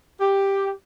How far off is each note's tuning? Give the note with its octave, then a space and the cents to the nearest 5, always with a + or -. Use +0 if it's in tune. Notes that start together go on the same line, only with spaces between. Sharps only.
G4 +5